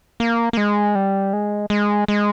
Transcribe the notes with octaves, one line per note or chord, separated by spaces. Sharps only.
A#3
A#3
G#3
G3
G#3
G#3
G#3